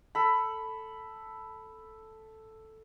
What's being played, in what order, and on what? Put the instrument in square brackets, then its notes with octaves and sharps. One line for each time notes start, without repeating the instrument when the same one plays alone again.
[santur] A4 B5